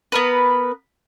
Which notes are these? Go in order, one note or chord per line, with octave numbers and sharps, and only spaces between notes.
B3 A#4 B4